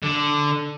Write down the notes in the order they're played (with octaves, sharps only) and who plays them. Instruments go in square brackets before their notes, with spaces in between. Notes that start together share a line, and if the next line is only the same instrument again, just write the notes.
[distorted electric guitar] D3